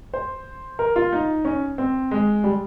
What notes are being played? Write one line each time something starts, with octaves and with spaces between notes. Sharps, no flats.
C5
A#4
F4
D#4
C#4
C4
G#3
G3